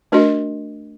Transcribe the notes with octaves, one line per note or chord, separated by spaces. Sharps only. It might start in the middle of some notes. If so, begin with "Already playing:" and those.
A3 D4 F#4 A#4 D#5